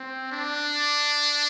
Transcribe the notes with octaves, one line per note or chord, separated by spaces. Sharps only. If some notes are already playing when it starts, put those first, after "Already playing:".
Already playing: C4
D4